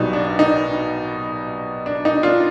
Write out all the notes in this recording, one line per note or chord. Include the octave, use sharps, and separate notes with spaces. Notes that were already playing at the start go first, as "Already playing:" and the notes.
Already playing: B1 B2 G3 D#4
D4
D#4
D4
D#4
D4 F4